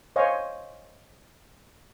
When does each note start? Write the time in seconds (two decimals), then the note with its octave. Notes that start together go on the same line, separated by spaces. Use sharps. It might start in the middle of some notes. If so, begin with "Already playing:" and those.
0.16 C5 C#5 D#5 F5 G#5